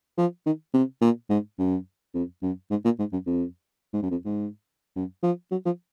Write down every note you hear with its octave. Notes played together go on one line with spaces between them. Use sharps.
F3
D#3
C3
A#2
G#2
F#2
F2
F#2
G#2
A#2
G#2
F#2
F2
G#2
F#2
F2
G#2
F#2
F3
F#3
F3